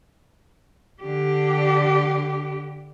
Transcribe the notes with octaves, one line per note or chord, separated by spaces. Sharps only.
D3 G4